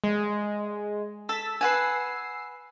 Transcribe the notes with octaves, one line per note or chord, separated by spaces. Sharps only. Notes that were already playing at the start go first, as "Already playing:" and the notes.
G#3
A4 E6 A6 B6
B4 F#5 G#5 E6 C7